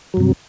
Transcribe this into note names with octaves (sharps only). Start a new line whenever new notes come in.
G2 C3 F#3